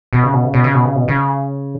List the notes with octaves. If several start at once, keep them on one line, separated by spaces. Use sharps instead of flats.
B2
C#3
B2
C#3
B2
C#3
B2
C#3
B2
C#3